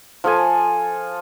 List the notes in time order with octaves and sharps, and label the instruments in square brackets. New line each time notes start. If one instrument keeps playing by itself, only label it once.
[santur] F3 A4 G#5